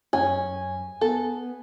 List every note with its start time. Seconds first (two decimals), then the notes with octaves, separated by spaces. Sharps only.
0.13 F#2 C#4 G#5
1.01 B3 A4